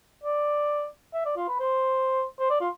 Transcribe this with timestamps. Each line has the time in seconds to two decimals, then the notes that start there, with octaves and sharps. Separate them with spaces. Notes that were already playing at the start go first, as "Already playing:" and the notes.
0.24 D5
1.14 E5
1.25 D5
1.37 F4
1.49 B4
1.60 C5
2.40 C5
2.50 D5
2.61 F4